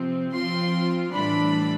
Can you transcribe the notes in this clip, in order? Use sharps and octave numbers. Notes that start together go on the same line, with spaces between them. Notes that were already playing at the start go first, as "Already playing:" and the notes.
Already playing: C3 F3 C4
F3 C4 F4 C6
A2 E3 G3 D4 B5